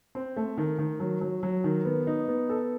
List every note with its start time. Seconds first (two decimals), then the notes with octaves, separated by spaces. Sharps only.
0.15 C4
0.37 A3
0.58 D#3
0.79 D#3
1.00 F#3
1.21 F#3
1.43 F#3
1.64 D#3
1.85 B3
2.07 D#4
2.28 B3
2.49 A4